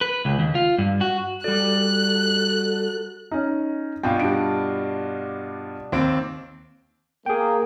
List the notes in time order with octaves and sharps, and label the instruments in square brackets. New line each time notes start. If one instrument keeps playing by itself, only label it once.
[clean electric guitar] B4
C#2
D#2
F4
G2
F#4
[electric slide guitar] G3 D5 [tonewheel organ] F#4 A4 [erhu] F#6
[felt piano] C#4 D#4
[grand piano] G2 B2 F4 [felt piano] G5
[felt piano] G3 D4 D7
[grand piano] D#2 C4 D7
[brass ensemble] A#3 [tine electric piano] G#4 G5